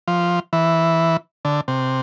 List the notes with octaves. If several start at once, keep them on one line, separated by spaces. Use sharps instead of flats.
F3
E3
D3
C3